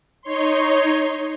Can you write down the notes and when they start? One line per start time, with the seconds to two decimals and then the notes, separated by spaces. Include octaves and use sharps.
0.22 D#4 C#5 C6